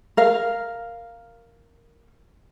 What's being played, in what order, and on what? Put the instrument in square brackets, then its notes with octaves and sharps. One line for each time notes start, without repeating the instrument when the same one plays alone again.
[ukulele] A#4 F5